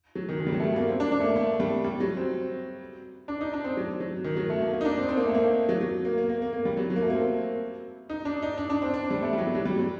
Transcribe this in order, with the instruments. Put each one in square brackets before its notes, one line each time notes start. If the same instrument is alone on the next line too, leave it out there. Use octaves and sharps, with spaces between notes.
[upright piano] F#3
D#3
D#3
G3
F#3
A3
G3
A#3
C4
D4
D4
A3
A#3
A3
G3
G3
F#3
C4
D4
D#4
D4
C4
F#3
F#3
D#3
F#3
A3
A#3
A#3
D#4
D4
C4
C4
A#3
A3
A#3
F#3
F#3
A#3
A#3
A#3
A#3
A#3
G3
F#3
F#3
A#3
A3
A#3
C4
D#4
D4
D#4
D4
D4
C4
D4
G3
A3
G3
F#3
F#3
G3
F#3